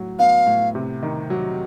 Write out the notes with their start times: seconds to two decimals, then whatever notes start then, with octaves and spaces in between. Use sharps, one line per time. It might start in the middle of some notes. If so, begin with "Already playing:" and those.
Already playing: A2 F#3
0.19 B3 F5
0.46 A2
0.75 C3
1.02 D#3
1.30 F#3